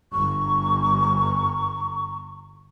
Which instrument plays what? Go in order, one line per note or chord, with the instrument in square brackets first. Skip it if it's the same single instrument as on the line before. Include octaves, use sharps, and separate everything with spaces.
[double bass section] G1 [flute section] A#5 C#6